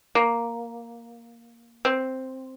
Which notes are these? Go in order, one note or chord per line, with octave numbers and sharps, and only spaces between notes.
A#3
C4